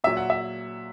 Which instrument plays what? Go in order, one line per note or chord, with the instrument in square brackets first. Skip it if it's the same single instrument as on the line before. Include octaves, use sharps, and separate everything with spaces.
[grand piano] A#2 F#3 E5
F#5
E5